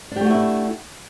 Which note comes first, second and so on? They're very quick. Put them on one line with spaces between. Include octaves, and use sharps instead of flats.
D4 G4 A3 F#4 E4